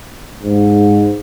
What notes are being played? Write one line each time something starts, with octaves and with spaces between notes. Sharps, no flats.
G#2